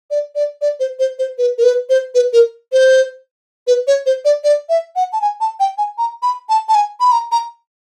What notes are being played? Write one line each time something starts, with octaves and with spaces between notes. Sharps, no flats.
D5
D5
D5
C5
C5
C5
B4
A#4
B4
C5
B4
A#4
C5
B4
C#5
C5
D5
D5
E5
F#5
A5
G#5
A5
G5
G#5
A#5
B5
A5
A5
G#5
B5
A#5
A#5